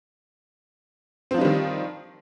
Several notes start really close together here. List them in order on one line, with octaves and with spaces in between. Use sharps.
C4 F3 D#4 G3 D#3